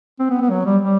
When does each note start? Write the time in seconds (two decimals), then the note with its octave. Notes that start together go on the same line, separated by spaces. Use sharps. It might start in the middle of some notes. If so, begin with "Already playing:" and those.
0.19 C4
0.30 B3
0.41 B3
0.50 F#3
0.66 G3
0.82 G3